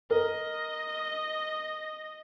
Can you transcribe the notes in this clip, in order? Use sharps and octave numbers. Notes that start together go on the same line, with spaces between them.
A#4 D#5